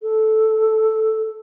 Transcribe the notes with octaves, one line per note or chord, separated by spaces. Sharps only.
A4